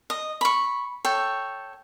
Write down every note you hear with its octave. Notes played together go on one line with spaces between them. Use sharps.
D#5
B5 C#6
A4 C#5 G5